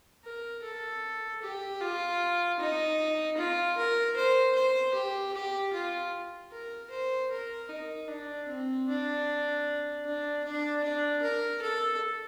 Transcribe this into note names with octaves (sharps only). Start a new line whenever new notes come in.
A#4
A4
G4
F4
D#4
F4
A#4
C5
C5
G4
G4
F4
A#4
C5
A#4
D#4
D4
C4
D4
D4
D4
D4
A#4
A4